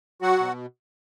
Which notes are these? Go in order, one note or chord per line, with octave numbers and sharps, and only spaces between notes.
F#3 F#4 F#5
B2